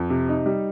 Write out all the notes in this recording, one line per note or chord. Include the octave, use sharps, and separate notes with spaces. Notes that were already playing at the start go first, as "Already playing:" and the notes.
Already playing: F2
C3
D#4
G3